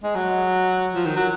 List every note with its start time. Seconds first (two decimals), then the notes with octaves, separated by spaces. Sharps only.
0.04 G#3
0.15 F#3
0.94 F3
1.06 D#3
1.16 F#3